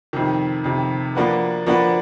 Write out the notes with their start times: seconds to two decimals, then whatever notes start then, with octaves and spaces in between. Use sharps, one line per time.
0.13 F2 C3 D#3
0.64 F2 C3 D#3
1.15 F3 A#3 D4 F#4 B4
1.66 F3 A#3 D4 F#4 B4